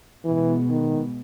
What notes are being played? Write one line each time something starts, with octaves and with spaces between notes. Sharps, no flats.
B2 E3 G#3 B3
D#3